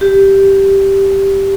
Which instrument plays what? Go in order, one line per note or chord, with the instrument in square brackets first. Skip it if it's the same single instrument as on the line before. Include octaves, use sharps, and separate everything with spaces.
[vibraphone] G4